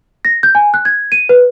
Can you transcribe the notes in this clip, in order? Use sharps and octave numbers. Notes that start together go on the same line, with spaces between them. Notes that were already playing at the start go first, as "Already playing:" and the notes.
A#6
G6
G#5
F#6
G#6
D#7
B4